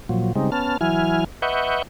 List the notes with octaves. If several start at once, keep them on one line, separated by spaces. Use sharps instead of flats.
A#2 F3 F#3
C#3 G3 G#3 C4 D#4
B3 C#4 A5 F6
E3 F#3 E4 G#5 F6
B4 D#5 E5 F#5 C#6 G6